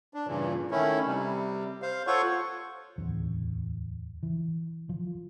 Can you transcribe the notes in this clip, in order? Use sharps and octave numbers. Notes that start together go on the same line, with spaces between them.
D4
G2 A#2 C#3 E3
D#3 A3 C#4 E4
C3 G3
C5 F5
F4 A4 C5 C#5 F#5 C#6
D1 E2
E3
F3